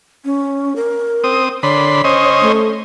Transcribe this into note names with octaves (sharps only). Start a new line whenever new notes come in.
C#4
A#4
C4 D#6
D3 C#5 B5 C6
C#4 C5 D#5
A3